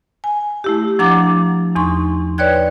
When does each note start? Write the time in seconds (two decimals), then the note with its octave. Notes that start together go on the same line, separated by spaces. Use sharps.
0.24 G#5
0.64 A3 E4 G4
0.99 F3 D4 F#5 A#5 D6 A6
1.75 E2 D#4 C6 C#6
2.38 B4 C#5 D5 G5 F#6 G#6